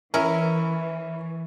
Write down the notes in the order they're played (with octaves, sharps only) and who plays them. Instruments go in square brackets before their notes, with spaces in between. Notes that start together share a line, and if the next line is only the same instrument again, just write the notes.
[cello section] E3 [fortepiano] C#4 E4 [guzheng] A#4